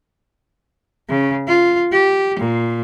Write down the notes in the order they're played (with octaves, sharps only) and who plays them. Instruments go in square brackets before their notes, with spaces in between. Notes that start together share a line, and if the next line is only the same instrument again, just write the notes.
[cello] C#3
F4
G4
A#2